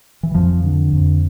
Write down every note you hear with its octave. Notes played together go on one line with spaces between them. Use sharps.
E3
F2 F3
D3
F2